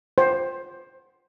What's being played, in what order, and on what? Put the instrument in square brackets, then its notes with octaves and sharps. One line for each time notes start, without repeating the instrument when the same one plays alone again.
[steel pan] C5